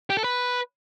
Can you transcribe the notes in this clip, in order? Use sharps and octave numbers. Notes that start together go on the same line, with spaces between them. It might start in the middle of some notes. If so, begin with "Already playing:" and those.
G4
A4
B4